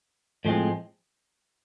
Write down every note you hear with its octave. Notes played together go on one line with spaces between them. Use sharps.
A2 F3 G#3 C4